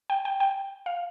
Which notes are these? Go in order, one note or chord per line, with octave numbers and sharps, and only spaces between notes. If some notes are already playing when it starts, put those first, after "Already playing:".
G5
G5
G5
F5